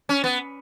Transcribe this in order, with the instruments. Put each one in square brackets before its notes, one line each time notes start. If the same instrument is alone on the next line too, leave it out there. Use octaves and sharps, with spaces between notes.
[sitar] C#4
B3